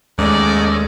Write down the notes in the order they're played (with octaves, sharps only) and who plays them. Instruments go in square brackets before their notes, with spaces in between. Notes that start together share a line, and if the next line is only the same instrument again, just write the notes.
[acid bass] D#2 [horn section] G#2 D5 [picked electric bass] G#3 [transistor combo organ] A3 C#4 D#5